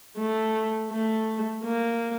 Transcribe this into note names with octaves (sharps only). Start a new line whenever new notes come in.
A3
A3
A#3